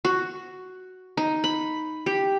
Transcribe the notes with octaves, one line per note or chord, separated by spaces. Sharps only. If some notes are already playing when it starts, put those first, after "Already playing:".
F#4
D#4
B5
G4